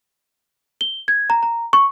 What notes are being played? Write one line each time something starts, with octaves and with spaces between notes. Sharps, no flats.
G7
G#6
A#5
A#5
C#6